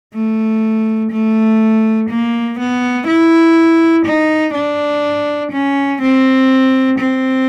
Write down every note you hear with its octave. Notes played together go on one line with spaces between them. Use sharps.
A3
A3
A#3
B3
E4
D#4
D4
C#4
C4
C4